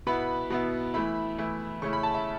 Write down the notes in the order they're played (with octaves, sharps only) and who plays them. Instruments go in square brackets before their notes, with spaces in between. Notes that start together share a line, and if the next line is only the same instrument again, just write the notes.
[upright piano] B2 B3 E4 B5
B2 B3 E4
E3 A3 E4 B5
E3 A3 E4
C#3 A3 C#4 E4 C#6
B5
A5
E5